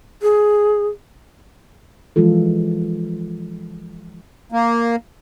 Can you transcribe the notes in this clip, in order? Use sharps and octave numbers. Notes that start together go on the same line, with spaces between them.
G#4
E3 F3 G#3 F4 A4
A#3